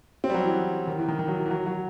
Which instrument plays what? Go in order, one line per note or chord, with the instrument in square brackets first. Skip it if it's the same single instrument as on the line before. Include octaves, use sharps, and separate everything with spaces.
[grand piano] C4
G3
F#3
E3
D#3
E3
D#3
D#3
F#3
E3
E3
F#3
F#3